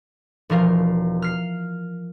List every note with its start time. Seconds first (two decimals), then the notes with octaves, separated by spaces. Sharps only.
0.50 E1 F3 A#4 F5
1.22 F6 C7